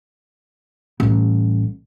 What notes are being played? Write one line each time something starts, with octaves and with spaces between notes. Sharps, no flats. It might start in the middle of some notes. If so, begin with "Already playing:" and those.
A1 G3